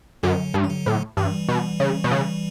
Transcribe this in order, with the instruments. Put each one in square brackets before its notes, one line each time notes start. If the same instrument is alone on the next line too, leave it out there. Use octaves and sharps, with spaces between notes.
[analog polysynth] F#2 [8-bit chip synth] D3 F#3
[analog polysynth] G2
[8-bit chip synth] E3
D3 F#3
[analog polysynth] A2
[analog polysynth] G2 [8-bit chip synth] E3 G3
[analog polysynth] B2
C#3
B2
C#3